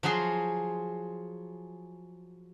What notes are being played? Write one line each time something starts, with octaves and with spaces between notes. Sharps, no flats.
F3 F#3 F#4 G#4 C6